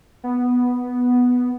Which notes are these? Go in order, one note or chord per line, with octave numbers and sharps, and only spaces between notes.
B3